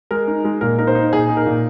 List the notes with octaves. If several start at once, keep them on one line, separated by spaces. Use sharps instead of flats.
G#3 A#4
D#4
G#3
A#2 A#4
D#4 A#4
C5
D#4
A#2 G#4
D#4
A#4
A#2